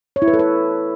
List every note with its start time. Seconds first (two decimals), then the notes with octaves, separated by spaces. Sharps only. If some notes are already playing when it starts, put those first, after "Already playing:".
0.16 C#5
0.22 E4
0.28 B4
0.33 A4
0.39 B4